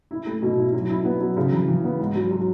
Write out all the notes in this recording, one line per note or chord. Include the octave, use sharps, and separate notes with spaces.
E4
A3
B2
E4
F#3
E4
B3
F#3
C#3
E3
E3
B3
G#2
F#3
F#3